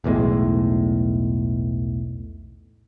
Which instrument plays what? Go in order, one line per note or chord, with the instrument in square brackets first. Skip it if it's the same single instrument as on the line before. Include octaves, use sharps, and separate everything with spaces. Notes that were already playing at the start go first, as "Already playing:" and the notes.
[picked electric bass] B1 E2 A2 G#3